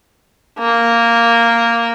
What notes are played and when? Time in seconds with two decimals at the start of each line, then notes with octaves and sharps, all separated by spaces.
0.59 A#3